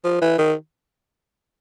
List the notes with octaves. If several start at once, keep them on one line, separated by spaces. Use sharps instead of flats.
F3
E3
D#3